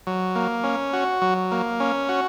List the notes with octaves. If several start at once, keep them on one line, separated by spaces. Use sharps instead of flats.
F#3
A#3
C#4
F#4
F#3
A#3
C#4
F#4